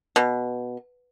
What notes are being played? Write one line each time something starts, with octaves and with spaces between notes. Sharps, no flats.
B2